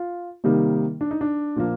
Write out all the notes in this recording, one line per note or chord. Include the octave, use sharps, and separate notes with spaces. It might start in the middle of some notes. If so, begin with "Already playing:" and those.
Already playing: F4
C3 D#3 G3 A#3 D#4
D4
D#4
D4
A#2 F3 A#3